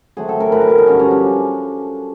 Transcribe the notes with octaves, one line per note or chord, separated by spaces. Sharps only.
D3 F#3 A3 C4 G#4
A4
A#4
A2 F#3 B3 B4
A#4
A4
D#4
G2 D3 F3 C#4
C#4
D4